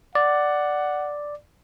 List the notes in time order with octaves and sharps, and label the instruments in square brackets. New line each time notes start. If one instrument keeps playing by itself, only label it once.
[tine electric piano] D5 [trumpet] F#5